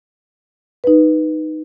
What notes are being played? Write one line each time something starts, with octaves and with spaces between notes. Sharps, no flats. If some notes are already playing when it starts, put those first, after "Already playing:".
D#4 B4